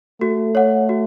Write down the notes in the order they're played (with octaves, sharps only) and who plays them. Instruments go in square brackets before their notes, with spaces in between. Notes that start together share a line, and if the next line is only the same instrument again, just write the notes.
[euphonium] A3 [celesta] F#4
[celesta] C#5 F#5
F#4